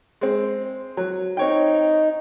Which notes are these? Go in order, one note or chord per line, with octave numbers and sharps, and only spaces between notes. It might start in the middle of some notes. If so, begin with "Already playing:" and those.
G#3 C4
F#3
C4 D#4 C#5 G5